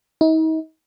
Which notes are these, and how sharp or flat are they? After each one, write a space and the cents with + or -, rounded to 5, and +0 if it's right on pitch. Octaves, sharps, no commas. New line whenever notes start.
D#4 +40